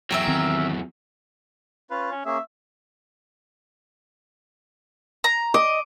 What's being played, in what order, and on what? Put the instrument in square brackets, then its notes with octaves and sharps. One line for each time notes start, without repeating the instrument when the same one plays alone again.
[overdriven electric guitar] E2 F#3 [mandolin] G4 A#4 E5
[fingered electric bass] D#3 C4
[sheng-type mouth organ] C#4 F4 F5 [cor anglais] B4
[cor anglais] C#4
[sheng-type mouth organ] A#3 C#4 G#4 [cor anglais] E5
[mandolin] A#5
[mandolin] D#5 [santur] D6